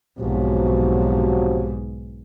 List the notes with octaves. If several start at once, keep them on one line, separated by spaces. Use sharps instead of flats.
B1 G#2 C3 F3 F#3